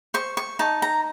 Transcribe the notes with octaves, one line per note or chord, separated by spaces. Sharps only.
C5 C#6
C#6
D#4 A5
A#5